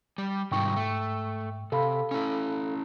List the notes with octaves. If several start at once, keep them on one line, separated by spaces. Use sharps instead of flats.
G3
G#2 C3 D#3 G3 G5 C#6
A3
C3 A4 F5 B5
C#4 E4